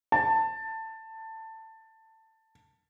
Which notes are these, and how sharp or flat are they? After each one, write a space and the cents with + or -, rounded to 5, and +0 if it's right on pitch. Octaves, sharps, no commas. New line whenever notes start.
A5 +15